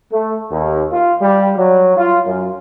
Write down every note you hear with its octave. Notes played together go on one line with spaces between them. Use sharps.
A3
D#2
F4
G3
F#3
F4
F#2